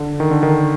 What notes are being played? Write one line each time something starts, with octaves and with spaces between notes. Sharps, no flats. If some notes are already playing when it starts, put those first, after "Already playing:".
Already playing: D3
D#3
D3
D#3